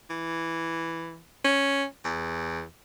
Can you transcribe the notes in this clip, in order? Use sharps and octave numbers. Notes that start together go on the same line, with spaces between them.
E3
C#4
E2